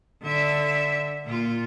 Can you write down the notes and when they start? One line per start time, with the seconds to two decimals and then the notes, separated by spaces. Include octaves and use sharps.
0.22 D3 E5
1.25 A#2 F4